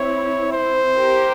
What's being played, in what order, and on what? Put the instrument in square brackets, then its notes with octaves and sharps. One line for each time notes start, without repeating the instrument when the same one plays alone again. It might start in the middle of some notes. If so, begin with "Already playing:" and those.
Already playing: [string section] C4 E4 [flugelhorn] C#5
[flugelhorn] C5
[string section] G4 A#4